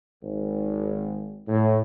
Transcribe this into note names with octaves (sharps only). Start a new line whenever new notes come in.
G#1
A2